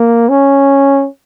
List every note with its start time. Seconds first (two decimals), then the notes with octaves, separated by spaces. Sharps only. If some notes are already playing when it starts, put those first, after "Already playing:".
Already playing: A#3
0.29 C#4